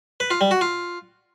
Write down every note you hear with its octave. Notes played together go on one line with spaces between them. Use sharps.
B4
F4
G3
F#4
F4